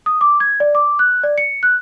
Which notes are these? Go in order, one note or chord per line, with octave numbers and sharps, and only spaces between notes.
D#6
D6
G#6
D5
D6
F#6
D5
C#7
F#6